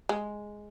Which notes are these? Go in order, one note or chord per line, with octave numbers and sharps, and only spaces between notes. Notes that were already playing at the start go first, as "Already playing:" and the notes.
G#3